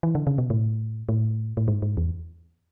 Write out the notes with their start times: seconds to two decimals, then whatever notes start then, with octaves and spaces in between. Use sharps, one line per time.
0.03 E3
0.15 D3
0.27 C#3
0.38 B2
0.50 A2
1.09 A2
1.57 A2
1.68 G#2
1.82 G#2
1.97 E2